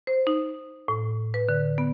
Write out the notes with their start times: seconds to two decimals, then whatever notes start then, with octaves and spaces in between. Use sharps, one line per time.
0.07 C5
0.27 D#4
0.88 A2
1.34 B4
1.49 D3
1.78 B3